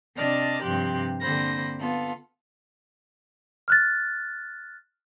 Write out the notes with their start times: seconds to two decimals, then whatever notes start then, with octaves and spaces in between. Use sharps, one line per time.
0.15 C3 D4 D5 D#5 A5 F6
0.63 G2 C3 F3 G4 C6 F#6
1.21 D3 A#3 C4 C5 B5 A#6
1.79 B3 F4 A4
3.68 F6 F#6 A6